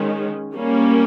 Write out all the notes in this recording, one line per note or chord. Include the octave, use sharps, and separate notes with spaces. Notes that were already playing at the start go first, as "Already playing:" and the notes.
Already playing: D#3 G#3 C#4
G3 A#3 C#4